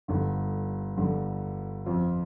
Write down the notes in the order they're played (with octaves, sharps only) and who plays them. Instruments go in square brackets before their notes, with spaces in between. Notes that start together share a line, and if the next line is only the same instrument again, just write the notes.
[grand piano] G1 G2 D3
G1 G2 D3
F2 F3 C4 F4